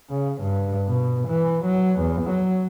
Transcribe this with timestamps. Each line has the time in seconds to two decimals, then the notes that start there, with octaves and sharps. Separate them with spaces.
0.10 C#3
0.43 G2
0.87 B2
1.28 E3
1.65 F#3
2.00 E2
2.30 F#3